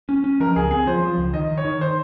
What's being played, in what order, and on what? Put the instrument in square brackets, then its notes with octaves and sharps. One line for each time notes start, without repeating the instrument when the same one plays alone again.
[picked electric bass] C#4
C#4
[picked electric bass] F3 [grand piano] A#4
[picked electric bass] C#2 [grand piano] G#4
[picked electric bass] C4 [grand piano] G#4
[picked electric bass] F3 [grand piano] C5
[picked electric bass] F3
C#2
[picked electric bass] D#3 [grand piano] D#5
[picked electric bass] D#3
[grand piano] C#5
[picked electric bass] D#3
[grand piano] C5